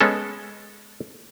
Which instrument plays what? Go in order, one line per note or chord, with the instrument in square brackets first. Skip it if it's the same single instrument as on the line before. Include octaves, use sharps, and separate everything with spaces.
[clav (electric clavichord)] G#3 B3 C#4 A4